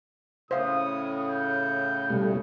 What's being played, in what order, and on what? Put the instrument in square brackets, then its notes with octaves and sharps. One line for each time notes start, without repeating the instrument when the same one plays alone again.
[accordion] A2 C#3 [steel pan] C5 E5 F5 [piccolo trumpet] D#6
[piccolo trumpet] G6
[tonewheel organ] B2 G3 A3